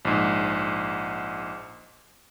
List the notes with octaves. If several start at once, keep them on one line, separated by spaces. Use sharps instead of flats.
A#1 G#2